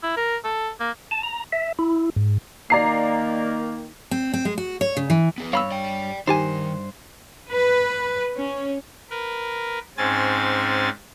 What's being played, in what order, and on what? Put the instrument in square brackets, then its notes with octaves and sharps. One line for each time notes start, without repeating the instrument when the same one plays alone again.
[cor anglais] E4
A#4
A4
A#3
[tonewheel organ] A5
A#5
E5
E4
G#2
[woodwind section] D#3 A#3 [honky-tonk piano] D5 A#5 C7
[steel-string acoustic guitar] C4
C4
G#3
F#4
C#5
C#3
E3
[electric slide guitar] B3 G#4 B4
[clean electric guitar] G2 C#5 [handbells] F5 B5 E6
[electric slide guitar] D5 G5
[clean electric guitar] G2 C5 [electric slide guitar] D#3 [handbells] D#4 G4 G#5
[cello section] B4
C#4
[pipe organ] A#4 B4
G#2 C4 C#4 G#5 A6